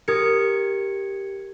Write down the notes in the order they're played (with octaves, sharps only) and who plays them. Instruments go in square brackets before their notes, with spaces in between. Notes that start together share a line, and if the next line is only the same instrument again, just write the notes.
[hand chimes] G4 G#6 C#7 [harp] A#4 D#6